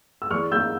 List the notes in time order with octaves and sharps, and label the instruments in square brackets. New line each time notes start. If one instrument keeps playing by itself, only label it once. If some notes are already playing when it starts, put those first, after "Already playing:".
[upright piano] E6
E2 C#6 F6
A#3 E6 G6